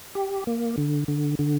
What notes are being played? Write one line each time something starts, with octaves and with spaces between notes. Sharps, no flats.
G4
A#3
D3
D3
D3